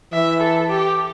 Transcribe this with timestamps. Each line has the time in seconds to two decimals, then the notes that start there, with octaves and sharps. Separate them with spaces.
0.12 E3 E5
0.40 A4
0.69 G4